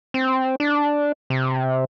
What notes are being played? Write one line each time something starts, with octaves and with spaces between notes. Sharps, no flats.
C4
D4
C3